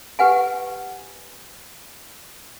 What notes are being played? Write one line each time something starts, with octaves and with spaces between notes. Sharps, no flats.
G4 B4 F#5 G#5